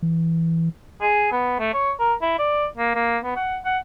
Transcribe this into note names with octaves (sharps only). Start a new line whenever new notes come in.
E3
G#4
B3
A3
C#5
A#4
E4
D5
A#3
A#3
B3
F#5
F#5